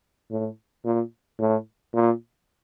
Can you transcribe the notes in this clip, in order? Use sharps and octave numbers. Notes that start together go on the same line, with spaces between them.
A2
A#2
A2
A#2